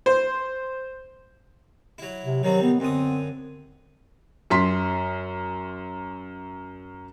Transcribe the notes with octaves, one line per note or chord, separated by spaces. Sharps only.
C5
F#3 E4
C3
D#3 F#3 G3 C4
B3
F#2 D3 C4 D#6
F#2 C6 B6